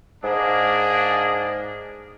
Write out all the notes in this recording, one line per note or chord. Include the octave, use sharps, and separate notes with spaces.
G#2 A#3 D4 G#4